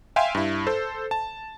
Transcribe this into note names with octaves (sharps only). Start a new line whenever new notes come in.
E5 F5 G5 G#5 C6
G2 E4
A4 C5
A5